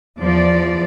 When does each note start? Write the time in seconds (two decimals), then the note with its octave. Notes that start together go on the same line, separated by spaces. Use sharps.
0.19 E2 F3 D5